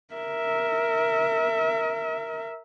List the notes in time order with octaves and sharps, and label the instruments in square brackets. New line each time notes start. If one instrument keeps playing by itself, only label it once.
[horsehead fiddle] A#4 E5